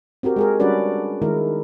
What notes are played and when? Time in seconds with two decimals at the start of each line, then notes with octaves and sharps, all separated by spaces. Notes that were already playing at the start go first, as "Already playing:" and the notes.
0.23 C4 F#4 G4 A#4
0.36 G#3 G#4 A#4
0.60 G3 C#4 D4 F#4 B4 D5
1.22 D#3 G#3 E4 A#4